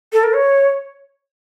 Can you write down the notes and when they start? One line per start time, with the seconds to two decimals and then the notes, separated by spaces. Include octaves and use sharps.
0.13 A4
0.24 A#4
0.33 C#5